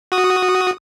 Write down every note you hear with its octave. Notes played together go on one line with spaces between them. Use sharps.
F#4 D#6